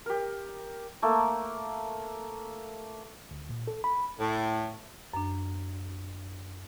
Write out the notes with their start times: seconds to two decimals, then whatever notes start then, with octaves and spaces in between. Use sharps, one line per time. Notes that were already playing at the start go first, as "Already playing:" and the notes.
0.06 G4 A#4
1.02 A3 A#3
3.31 D2
3.49 A#2
3.67 A4
3.84 B5
4.20 A2
5.14 F#2 D4